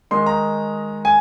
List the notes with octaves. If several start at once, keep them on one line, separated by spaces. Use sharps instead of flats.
D#3 G#3 D#4 C6
A#5
G#5